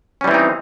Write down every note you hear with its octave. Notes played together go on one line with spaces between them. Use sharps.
E3 G3 C4 C#4 D#4